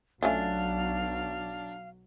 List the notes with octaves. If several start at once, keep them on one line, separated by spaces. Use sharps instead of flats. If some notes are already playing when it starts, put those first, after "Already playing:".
B1 F#3 A3 C#4 D4 F4 F5